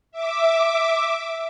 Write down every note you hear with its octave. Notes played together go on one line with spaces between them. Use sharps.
E5 D6